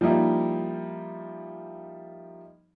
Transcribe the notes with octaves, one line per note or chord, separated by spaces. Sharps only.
F3 G3 A#3 D#4 E4